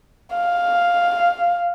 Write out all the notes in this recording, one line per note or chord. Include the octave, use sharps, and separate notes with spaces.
F5